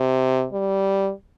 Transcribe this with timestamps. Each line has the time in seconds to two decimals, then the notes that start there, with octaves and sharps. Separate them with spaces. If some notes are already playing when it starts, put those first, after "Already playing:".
Already playing: C3
0.53 G3